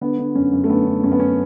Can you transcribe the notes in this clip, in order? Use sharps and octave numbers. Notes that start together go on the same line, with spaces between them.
D3 B3
D3
F#2 C#4
F#2
A3
D3 B3
D3
F#2 C#4
B3
C#4